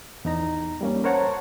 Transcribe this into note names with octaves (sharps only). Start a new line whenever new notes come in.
E2 D#4 A#5
G3 A#3 C#4
A#4 C5 C#5 F#5 A5 A#5